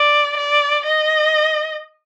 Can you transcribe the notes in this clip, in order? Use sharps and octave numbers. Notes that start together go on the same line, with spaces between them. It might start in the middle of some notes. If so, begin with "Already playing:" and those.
Already playing: D5
D5
D#5